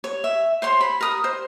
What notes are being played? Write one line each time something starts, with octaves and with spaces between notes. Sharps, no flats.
C#5
E5
C5 C#5 C6
B5
A#4 D#6
C5